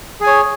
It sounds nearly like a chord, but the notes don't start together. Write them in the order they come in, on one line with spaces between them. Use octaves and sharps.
G#4 G#5 C#5